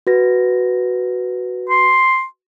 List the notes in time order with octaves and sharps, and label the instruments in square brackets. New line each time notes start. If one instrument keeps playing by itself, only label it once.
[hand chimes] F#4 B4 A#6
[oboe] C6